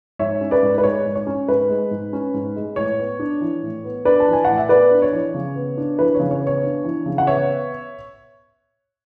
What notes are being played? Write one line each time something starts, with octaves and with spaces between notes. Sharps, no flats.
G#2 C#5 E5
C#4
B4 D5
G#2
B4
G#3 C#5
G#2
C#5
C#4
G#2 B4
G#3
G#2
C#4
G#2
G#3
A2 C#5
B3
D4
E3
A2
B3
D4 B4 D5
A5
E3
G#5
A2 F#5
E5
B3 B4 D5
D4
C#5
E3
C#3
B3
D4
E3 B4
C#3 C#5
C#5
B3
C#5
D4
E3
C#3
F#5
B3 C#5 E5